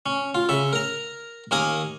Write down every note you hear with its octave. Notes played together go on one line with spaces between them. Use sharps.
C#4
F4
C#3 E5
A#4 A#5
D#2 A#3 A#4 G#5 D#6